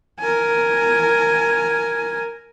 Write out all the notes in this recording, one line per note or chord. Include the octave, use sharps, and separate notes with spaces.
A#4 G#5